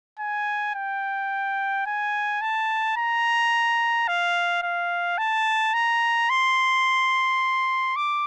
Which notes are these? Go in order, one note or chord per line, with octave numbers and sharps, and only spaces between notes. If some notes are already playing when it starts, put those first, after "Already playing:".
G#5
G5
G#5
A5
A#5
F5
F5
A5
A#5
C6
D6